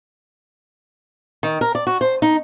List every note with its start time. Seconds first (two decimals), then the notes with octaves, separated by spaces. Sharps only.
1.43 D#3
1.61 A#4
1.75 D5
1.87 F#4
2.01 C5
2.22 D#4